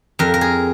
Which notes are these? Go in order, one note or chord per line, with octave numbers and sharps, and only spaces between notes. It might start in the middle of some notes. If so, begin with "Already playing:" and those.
F2 A#4
A#4
G#4